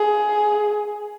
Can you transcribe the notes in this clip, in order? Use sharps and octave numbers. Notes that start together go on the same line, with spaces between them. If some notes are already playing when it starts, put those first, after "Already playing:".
Already playing: G#4